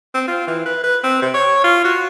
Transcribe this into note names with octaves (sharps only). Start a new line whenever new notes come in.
C4
F4
E3
B4
B4
C4
C3
C#5
F4
F#4